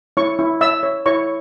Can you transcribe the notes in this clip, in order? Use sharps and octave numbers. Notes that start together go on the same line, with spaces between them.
E4 C#5 C#6
E4
C#5 E5 E6
C#5
E4 C#5 C#6